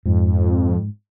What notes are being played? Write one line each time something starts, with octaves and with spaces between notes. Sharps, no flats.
F2 G#2